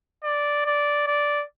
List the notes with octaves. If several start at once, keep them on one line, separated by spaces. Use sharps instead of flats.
D5
D5
D5